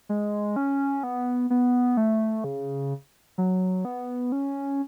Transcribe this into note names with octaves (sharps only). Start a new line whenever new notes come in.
G#3
C#4
B3
B3
A3
C#3
F#3
B3
C#4